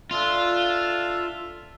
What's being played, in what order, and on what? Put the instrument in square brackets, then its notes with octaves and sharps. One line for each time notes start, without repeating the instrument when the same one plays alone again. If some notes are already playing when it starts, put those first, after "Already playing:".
[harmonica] D4 A4 E5 [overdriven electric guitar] F4